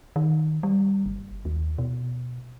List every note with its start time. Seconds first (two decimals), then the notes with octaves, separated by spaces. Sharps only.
0.16 D#3
0.63 G3
1.06 G1
1.45 D#2
1.78 B2